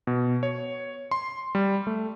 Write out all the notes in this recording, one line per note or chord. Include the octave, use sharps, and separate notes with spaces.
B2
C#5
C6
G3
A3